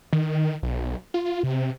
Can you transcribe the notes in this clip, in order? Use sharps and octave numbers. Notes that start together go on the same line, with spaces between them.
D#3
B1
F4
C3